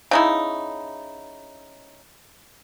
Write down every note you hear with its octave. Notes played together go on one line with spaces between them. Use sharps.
C#3 D#4 E4